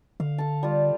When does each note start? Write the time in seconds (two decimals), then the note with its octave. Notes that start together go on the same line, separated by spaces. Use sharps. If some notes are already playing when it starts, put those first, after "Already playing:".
0.20 D3 F5
0.38 A4 A5
0.63 G3 F4